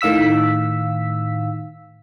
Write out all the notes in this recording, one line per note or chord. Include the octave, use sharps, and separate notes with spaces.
A2 D#3 F5 E6 B6